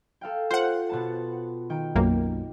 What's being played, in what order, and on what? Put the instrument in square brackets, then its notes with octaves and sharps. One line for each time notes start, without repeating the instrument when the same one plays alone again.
[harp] A4 F5 G5
[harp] F4 [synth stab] C5 F#5
[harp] B2 B3 A5
D#3 G5
[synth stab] B1 F#2 A#3